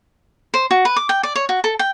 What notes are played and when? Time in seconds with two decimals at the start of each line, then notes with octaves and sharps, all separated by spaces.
0.54 C5
0.71 F#4
0.85 B4
0.96 D6
1.09 G5
1.23 D5
1.35 C#5
1.49 F#4
1.64 A4
1.79 G5